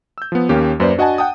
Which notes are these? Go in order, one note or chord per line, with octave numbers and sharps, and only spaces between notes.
E6 G6
F3 B3
D#2 A#3 C#4 G4
F#2 A#3 B4 C5 D5
D4 F#4 D#5 F#5 G#5 A5
F#5 G5 A5 D#6